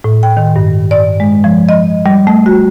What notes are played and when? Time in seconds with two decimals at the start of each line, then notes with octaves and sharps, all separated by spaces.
0.04 A2
0.23 G5
0.37 D#3
0.56 G2
0.91 D5
1.20 G#3
1.44 F3
1.69 D#5
2.06 G3
2.27 A3
2.46 F#4